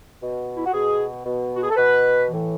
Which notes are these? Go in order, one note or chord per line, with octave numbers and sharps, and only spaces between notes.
B2
E4
F#4
B2 G#4
B2
F#4
G#4
A4
B2 B4
A2 E3